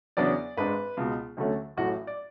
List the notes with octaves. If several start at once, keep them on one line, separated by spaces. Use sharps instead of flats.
E2 C#3 F#3 B3 D4 D5
G#1 G#2 G#3 D4 B4
C#2 B2 G#3
D2 D3 F#3 A3 C#4
A1 A2 F#3 A3 F#4
D5